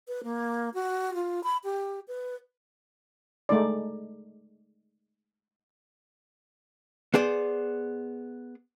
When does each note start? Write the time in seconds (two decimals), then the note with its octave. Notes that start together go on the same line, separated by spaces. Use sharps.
0.08 B4
0.24 A#3
0.74 F#4
1.14 F4
1.44 B5
1.64 G4
2.08 B4
3.49 G#3 A3 D#4 D5
7.14 B3 G#4 C5 D5